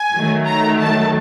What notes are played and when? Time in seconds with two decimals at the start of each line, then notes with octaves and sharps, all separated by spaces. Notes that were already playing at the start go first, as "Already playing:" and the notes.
Already playing: G#5
0.14 D#3 F#3 A3
0.47 A#5
0.80 A5